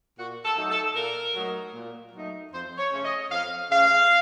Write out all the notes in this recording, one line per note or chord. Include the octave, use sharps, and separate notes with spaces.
A#2 F#4
A4
F#3 A3 D#4
A4
A#2 A#4
F#3 A3 D#4
A#2
F#3 A3 D#4
F2 C5
C#5
C#3 A3 C#4
D#5
F2 F5
C#3 A3 C#4 F5